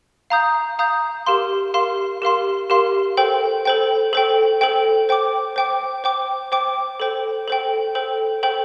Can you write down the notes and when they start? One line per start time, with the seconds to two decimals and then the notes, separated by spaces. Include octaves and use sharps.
0.30 F5 A#5 D#6 G6
0.79 F5 A#5 D#6 G6
1.26 G4 A#4 F5 C6
1.74 G4 A#4 F5 C6
2.22 G4 A#4 F5 C6
2.70 G4 A#4 F5 C6
3.17 A4 C5 G5
3.65 A4 C5 G5
4.13 A4 C5 G5
4.61 A4 C5 G5
5.09 C5 G5 D6
5.56 C5 G5 D6
6.04 C5 G5 D6
6.52 C5 G5 D6
7.00 A4 C5 G5
7.48 A4 C5 G5
7.95 A4 C5 G5
8.43 A4 C5 G5